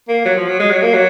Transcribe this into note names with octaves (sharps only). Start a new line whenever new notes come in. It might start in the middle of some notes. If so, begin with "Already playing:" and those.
A#3
F#3
F3
F#3
G#3
F#3
A#3
F#3